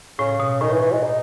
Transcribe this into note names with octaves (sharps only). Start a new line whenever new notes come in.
A2 C#3
B2
A2 D#3
E3
E3
G#3
D#4